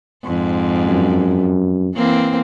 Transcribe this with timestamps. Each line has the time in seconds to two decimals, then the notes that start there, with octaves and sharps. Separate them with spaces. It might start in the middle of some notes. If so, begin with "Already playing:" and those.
0.24 F2 G#2
0.86 F#2
1.95 E3 A#3 C4